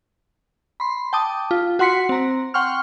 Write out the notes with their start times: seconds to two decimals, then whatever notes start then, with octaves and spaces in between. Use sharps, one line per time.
0.80 B5 C6
1.13 G5 A5 D6 D#6
1.51 F4
1.79 F#4 F#5 C6 B6 C#7
2.09 C4 A#5
2.54 F#5 G5 C6 C#6 F6